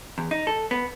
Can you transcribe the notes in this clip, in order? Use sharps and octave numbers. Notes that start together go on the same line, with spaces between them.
E2
D#4
A4
B3